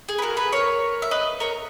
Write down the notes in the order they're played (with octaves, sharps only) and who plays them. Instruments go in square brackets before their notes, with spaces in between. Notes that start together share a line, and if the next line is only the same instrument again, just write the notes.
[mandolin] G#4
B4
F#4 A#4
G#4 B4
A#4 C#5
E5
B4 D#5
A#4 C#5